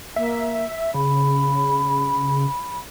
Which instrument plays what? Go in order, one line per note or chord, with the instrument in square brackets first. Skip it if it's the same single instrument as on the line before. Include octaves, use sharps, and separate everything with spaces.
[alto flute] A#3 [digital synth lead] E5
[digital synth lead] C#3 [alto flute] B5